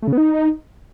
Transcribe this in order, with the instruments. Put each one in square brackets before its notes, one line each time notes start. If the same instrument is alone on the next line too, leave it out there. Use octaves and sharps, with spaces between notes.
[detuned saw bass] A3
C#3
B3
D#4